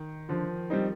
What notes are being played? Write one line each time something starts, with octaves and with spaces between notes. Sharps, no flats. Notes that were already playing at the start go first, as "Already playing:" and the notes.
Already playing: D#3
D3 F3
G3 C4 D#4